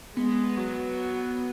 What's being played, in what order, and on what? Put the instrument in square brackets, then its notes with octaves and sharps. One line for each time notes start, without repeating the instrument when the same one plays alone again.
[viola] G#3 [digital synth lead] B3
[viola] F#3